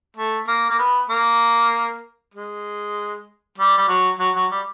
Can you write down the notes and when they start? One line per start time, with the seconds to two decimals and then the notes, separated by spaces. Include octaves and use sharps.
0.17 A3
0.47 A#3
0.70 A#3
0.79 B3
1.10 A#3
2.34 G#3
3.58 G3
3.78 G3
3.88 F#3
4.19 F#3
4.35 F#3
4.51 G3